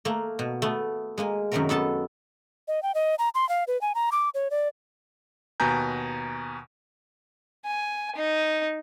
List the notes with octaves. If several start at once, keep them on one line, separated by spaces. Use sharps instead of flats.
A3 A#3
B2
A3 B3
G#3 A#3 G#5
F#2 C3 D#3 F#3 A3 A#4
F#2 B3 A4 A5
D#5
G5
D#5
A#5
C6
F5
B4
G#5
A#5
D6
C#5
D5
D#2 B2 B4 G#5 A#5 G6
G#5
D#4